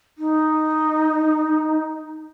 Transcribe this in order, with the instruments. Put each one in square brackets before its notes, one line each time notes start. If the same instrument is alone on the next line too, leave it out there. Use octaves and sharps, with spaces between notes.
[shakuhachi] D#4